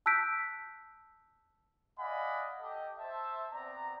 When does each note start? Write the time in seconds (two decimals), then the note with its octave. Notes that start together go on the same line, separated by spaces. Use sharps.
0.06 A5 E6 F#6 G6 B6 D7
1.98 D5 D#5 F5 F#5 G#5 B5
2.60 G4 A4 D#5
2.98 C5 E5 A5
3.53 B3 C4 D5 A#5